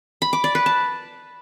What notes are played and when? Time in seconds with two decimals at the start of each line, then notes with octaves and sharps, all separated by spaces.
0.22 B5
0.33 D6
0.44 D5
0.55 B4
0.66 A5